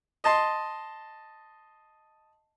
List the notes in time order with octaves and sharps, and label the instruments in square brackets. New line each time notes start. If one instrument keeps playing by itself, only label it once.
[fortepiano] D#5 A5 C6